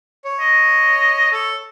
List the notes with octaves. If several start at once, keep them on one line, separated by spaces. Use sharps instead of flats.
C#5
D#5
A4